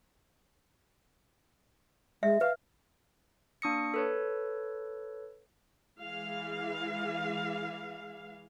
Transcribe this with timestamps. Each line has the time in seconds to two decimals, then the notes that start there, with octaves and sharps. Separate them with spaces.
2.23 G#3 E5
2.41 B4 F5
3.62 A#3 D4 C#6 D#6 A#6 C#7
3.94 A4 B4 C#5
5.99 E3 G#3 F5